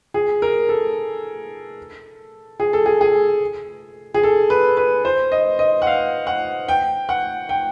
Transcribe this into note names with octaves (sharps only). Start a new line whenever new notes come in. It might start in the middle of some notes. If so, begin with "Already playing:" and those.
G#4
A#4
A4
G#4
A4
G#4
G#4
G#4
A4
B4
B4
C5
D#5
D#5
F#5
F5
F#5
G5
F#5
G5